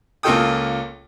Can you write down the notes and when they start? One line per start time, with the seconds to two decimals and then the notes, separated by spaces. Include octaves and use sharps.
0.23 C#2 A#3 F4 A4 G5 D#6